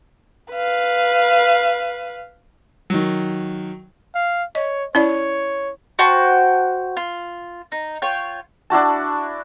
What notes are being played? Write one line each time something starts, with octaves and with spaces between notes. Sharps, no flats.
B4 F5
D#3 F#3
F5
C#5 D#5
C#4 E4 C#5 D5
F#4 C5 G5 A5
F4
D#4
F4 C#5 G5
D4 E4 F#4 A5